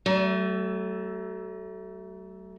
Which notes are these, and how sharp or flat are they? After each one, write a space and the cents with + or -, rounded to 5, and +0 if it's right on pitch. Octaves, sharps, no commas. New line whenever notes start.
F#3 +40 A3 +0